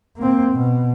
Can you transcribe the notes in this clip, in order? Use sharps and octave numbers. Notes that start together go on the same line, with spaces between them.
A#3 C4
B2